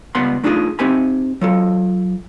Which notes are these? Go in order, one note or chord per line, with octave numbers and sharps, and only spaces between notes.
C#2 G3 B3 F#5 B5 C6
A3 D4 D#4 F4 F#4 G#4
C4 D#4 G4 G#5 B5
F#3 F4 A4